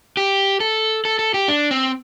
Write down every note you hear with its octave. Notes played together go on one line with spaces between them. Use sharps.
G4
A4
A4
A4
G4
D4
C4